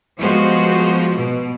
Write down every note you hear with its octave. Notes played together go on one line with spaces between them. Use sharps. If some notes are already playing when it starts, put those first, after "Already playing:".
F3 G3 G#3 B3 F#4 C5
B2